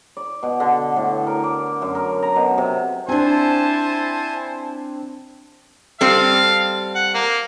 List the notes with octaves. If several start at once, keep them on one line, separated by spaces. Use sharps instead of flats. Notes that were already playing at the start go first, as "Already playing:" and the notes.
D5
B2
D3
A2
A#4
D6
F#2
A#4
A#5
B2
C3
C4 D4 E4 C5 G#5 A5
G3 C4 A4 F5
F#5
A#3